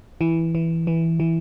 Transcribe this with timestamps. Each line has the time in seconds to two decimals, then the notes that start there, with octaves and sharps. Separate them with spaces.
0.21 E3
0.55 E3
0.87 E3
1.20 E3